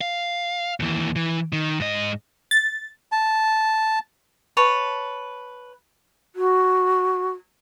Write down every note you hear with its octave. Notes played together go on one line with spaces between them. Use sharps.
F5
D#2 E3
E3
D#3
G#2 D#5
A6
A5
B4 C#5 A5
F#4